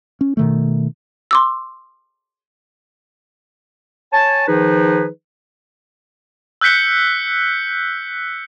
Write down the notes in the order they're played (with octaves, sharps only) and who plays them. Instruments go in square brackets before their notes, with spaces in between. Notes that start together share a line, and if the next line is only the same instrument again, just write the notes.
[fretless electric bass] C#4
B2 D#3 A3
[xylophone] C6 D6 E6
[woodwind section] C#5 G#5 A5
D#3 F3 D#4 G#4 B4
[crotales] E6 F#6 G6 B6 C#7 G7